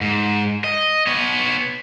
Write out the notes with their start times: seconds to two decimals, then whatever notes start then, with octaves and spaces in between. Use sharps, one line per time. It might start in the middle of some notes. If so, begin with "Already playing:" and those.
0.01 G#2
0.64 D#5
1.07 B3 C#5